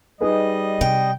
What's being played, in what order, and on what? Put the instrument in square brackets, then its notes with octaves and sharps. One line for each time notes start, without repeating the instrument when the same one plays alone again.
[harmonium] G3 D#5 [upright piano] D#4 G#4 B4
[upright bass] C3 [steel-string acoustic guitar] G5